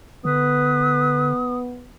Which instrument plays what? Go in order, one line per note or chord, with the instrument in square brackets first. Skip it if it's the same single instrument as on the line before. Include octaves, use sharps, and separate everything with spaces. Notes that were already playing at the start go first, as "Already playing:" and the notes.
[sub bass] D3 [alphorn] B3 [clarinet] B4 [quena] D#6